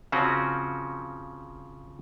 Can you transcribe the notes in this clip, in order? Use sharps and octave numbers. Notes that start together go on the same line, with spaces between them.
C#3 F3 C4 C#4 F#4